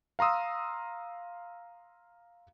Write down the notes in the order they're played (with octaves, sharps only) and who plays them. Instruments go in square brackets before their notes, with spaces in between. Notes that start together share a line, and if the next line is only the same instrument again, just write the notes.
[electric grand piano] F5 A#5 C6 D#6 E6